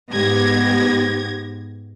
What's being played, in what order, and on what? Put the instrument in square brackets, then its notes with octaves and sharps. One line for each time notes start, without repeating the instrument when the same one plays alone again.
[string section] G#2 B3 G4 G#6 A#6